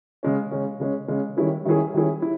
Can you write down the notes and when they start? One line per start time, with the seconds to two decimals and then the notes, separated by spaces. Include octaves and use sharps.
0.23 C#3 G#3 C#4
0.51 C#3 G#3 C#4
0.80 C#3 G#3 C#4
1.08 C#3 G#3 C#4
1.37 D#3 G3 C#4 E4 G#4
1.65 D#3 G3 C#4 E4 G#4
1.94 D#3 G3 C#4 E4 G#4
2.22 E4